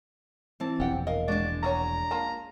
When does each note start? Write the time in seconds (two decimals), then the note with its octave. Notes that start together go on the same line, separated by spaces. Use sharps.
0.60 E3 C4 A5
0.80 E1 A#1 E2 G4 F#5 G5
1.07 A#4 D#5 F5
1.28 G#3 D4 F#4 D5
1.63 F#4 G#4 C#5 A#5
2.11 A#3 F4 A5